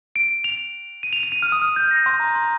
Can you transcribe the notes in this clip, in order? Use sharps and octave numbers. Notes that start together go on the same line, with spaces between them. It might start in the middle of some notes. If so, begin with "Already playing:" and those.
D7
F7
D#7
F7
F7
D#7
F6
D#6
F6
G6
A#6
C6
A#5
C6